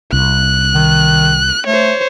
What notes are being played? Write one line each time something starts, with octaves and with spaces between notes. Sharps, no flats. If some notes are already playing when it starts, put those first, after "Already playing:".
C2 F#6
D#3
A3 C5 C#5